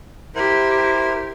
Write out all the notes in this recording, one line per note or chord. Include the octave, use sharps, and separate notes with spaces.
E4 G4 A#4 C5